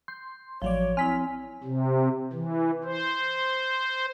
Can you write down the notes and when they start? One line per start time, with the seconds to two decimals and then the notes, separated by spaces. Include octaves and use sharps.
0.08 C6 G6
0.62 A1 F3 F#3 C#5 D5
0.97 C4 E4 G#5 F6 B6
1.64 C3
2.33 E3
2.84 C5